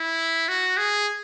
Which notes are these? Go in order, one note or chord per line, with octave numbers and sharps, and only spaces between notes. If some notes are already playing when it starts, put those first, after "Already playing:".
Already playing: E4
F#4
G#4